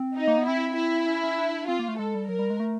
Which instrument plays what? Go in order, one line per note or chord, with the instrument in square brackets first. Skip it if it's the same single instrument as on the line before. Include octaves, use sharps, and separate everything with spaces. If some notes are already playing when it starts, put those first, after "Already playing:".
Already playing: [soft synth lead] C4
[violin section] D#4
[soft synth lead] A#3
B3
[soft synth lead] C4 [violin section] E4
[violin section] E4
[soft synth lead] C#4
C#4
D4
[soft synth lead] C4 [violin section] F4
[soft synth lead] A#3
A3
[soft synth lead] G#3 [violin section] A4
[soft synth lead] G3
[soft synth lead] F#3 [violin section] A#4
[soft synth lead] G3
G#3
A3